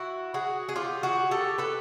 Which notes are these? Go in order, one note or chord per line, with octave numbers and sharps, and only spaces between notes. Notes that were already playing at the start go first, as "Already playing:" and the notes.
Already playing: E4 F#4
F#4 G#4
G#4
F4 G4
F#4 G#4
G4 A4
A4 B4